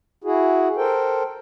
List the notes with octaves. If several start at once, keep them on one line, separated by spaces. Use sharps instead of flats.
E4 F#4 G#4
A4 A#4 C5 G5